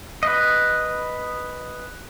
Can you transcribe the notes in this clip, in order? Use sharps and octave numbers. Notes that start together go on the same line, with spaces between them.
B4 D#5